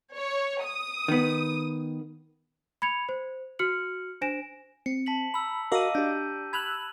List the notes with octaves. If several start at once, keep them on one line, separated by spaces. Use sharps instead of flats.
C#5
D#6
D#3 B3
B5 G#6 C#7 F7
C5
F#4 F6 C#7 F#7
D4 C5 G#5 A#6 D7 E7
C4 C#7
A5 B6 F#7
A#5 B5 E6
F#4 A#4 D#5 F5 D6 E6 A#6 D#7
D4 G4 G6
B5 E6 F#6 G#6 F7 F#7